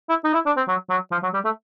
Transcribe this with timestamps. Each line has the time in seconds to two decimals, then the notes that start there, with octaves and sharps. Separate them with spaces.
0.09 E4
0.24 D#4
0.34 E4
0.46 D4
0.57 C4
0.68 F#3
0.90 F#3
1.12 F3
1.23 F#3
1.34 G3
1.45 A3